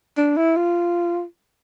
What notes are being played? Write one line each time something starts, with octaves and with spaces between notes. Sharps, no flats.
D4
E4
F4